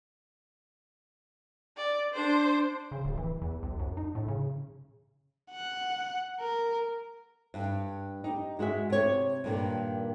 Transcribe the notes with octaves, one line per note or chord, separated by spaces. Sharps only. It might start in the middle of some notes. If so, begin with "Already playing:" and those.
D5
D4 C5
C#3
D1
E3
E2
C2
F#2
D#4
A2
C#3
F#5
A#4
G2
D#4 G4
G#3 F#4 G#4 E5
C3 C#5
G2 A#2 D#3